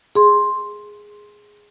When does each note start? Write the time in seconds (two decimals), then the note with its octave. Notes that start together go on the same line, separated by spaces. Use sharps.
0.16 G#4 C6